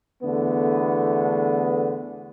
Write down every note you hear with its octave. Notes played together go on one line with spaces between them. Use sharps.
E2 D3 A3 B3